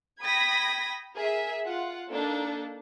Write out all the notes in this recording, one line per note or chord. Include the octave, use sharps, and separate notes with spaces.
G5 B5 D#6 G#6 A#6 B6
G#4 A#4 E5
F4 F#5
A#3 D4 D#4 A4